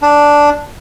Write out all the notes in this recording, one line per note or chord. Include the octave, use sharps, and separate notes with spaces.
D4